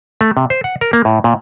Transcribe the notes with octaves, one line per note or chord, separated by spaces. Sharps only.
A3
C3
C5
F#5
A#4
A#3
A2
A#2